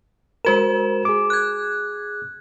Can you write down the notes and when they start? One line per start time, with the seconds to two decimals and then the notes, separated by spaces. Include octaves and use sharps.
0.45 G#3 F#4 A#4 C5 E7
1.05 G#4 D6
1.30 F#6 G#6